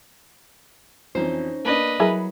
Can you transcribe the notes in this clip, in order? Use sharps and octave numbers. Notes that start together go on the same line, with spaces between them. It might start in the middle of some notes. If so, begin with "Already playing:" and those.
F2 E3 C#4 D#4 C5
A#3 D4 B4 D#5
F#3 E4 G#4 A#4 B5